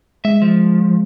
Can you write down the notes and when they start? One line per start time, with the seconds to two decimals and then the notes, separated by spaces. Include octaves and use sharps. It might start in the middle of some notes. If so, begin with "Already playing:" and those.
0.25 G#3 E5
0.42 F3